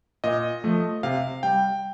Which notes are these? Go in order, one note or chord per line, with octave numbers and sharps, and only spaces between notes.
A#2 D#5
F3 A3
C3 F5
G3 G5